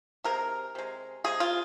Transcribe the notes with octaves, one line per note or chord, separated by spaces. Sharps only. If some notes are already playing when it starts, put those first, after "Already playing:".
C3 G#3 A#4
C3 G#3
C3 G#3 G#4
F4